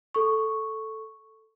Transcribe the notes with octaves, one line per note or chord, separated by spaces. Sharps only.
A4 C#6